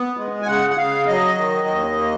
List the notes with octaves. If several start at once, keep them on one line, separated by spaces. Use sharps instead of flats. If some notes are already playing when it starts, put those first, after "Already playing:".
Already playing: B3
G#3
G#5
C#3 F#5
F#5
C#3 F5
F#3 D#5
D#3
D#2
A#3